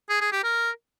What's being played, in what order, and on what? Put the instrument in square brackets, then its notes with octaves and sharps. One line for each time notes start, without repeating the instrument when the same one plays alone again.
[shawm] G#4
G#4
G4
A#4